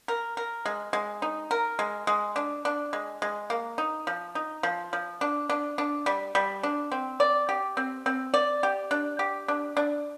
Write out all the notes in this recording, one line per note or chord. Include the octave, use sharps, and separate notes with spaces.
A#4
A#4
G#3
G#3
D#4
A#4
G#3
G#3
D4
D4
G#3
G#3
A#3
D#4
F3
D#4
F3
F3
D4
D4
D4
G3
G3
D4
C4
D5
G4
C4
C4
D5
G4
D4
G4
D4
D4